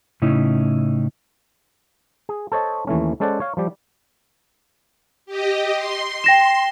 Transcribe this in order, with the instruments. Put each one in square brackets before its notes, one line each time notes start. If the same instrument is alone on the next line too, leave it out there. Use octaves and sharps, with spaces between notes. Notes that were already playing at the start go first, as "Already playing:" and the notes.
[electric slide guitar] A2 C#3 C#4 D#4 E4
[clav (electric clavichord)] G#4
A4 C5 C#5 D#5 A5
D#2 E3 A3 C#4
G#3 C#4 A4 C5 D5 F#5
C#5 F5
F3 G3 G4
[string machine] G4 D#5
C6
[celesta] G5 A#6 E7